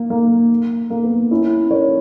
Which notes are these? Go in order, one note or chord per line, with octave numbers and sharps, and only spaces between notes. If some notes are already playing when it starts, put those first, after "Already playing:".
Already playing: A#3
A#3
A#3
B3
C#4 E4
A#4 C#5